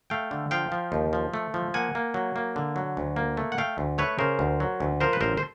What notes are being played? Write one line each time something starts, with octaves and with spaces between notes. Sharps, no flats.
A3 F5 G5
D3
F3 F5 G5
F3
D#2
F3
A3
F3
A#3 F#5 G#5
A#3
F#3
A#3
D3
F#3
D2
A#3
A3
F#5
A3 F5 G5
D2
A3 B4 C#5
C#3 A#4 C5
D2
F#3
D2
F3 A#4 C5
B4
A1 A#4 C5
C5